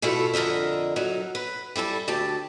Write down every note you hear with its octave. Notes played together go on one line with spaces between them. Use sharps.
B2 A3 E4 F4 A4
F2 D3 A#4 D#5 E5
F#3 D#4
B4
G3 E4 G#4 A4
D2 G4 A5